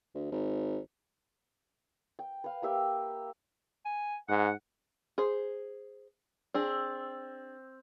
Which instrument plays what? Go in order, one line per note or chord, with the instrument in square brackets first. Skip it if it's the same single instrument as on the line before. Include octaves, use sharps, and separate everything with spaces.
[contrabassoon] D2
G#1
[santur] G5
B4 F5
A#3 G4 E5 G5
[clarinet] G#5
[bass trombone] G#2 [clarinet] F#5
[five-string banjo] G#4 C5
[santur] C4 [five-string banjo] D4 G#4